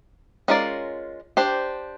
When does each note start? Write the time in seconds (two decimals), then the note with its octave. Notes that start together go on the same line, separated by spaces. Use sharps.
0.48 G#3 C#4 F4 A#4 D5
1.37 D4 G4 C5